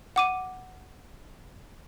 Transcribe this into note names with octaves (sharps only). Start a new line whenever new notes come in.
F#5 D6 D#7